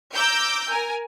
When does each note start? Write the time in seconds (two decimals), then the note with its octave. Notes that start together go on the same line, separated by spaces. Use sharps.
0.13 A#5 D6 E6 G6
0.69 A#4 G#5